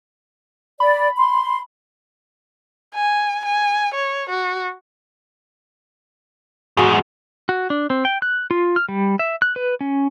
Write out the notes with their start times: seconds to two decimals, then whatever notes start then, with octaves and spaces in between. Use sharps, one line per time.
0.80 D5 B5
1.17 C6
2.95 G#5
3.45 G#5
3.94 C#5
4.29 F#4
6.77 E2 G#2 F#4 G#4
7.49 F#4
7.70 D4
7.90 C4
8.05 G5
8.22 F#6
8.51 F4
8.76 F6
8.89 G3
9.19 E5
9.42 F#6
9.56 B4
9.81 C#4